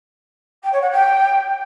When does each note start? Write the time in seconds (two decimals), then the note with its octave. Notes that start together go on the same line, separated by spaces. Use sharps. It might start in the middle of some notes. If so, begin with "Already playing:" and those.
0.63 G5
0.72 C#5
0.81 F#5
0.90 G5